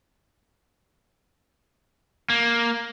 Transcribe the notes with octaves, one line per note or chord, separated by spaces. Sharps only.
A#3